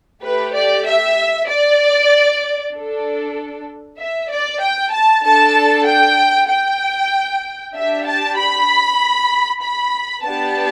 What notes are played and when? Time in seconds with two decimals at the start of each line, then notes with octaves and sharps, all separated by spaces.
0.23 A3 G4 B4
0.55 D5
0.86 E5
1.49 D5
2.74 D4 A4
3.99 E5
4.30 D5
4.61 G5
4.92 A5
5.24 D4 A4 A5
5.86 G5
6.49 G5
7.74 D4 G4 E5
8.05 A5
8.37 B5
9.62 B5
10.24 B3 D4 G4 A5